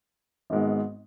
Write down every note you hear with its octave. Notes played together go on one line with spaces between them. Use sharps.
G#1 G#2 G#3 B3